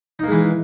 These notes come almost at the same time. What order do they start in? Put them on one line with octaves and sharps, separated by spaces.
D#4 A#3 G#3 E3